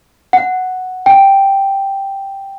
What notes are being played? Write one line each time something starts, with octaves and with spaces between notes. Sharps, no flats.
F#5
G5